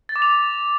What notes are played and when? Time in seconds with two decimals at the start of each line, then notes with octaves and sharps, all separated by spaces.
0.09 A6
0.16 D6
0.22 F7